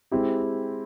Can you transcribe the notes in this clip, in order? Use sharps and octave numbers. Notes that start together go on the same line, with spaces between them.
G#3 C4 E4 G4